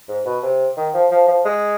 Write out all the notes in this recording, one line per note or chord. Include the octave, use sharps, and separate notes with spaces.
G#2
B2
C3
D#3
F3
F3
F3
G#3